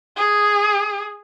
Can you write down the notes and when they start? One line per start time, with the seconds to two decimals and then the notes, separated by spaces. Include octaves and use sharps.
0.17 G#4